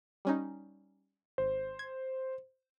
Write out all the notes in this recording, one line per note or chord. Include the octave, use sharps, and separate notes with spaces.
G3 C#4 D#4
G#1 C5
G#6